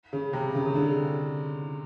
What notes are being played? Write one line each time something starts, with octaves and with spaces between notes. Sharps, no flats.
C#3
C3
C#3
C#3
D3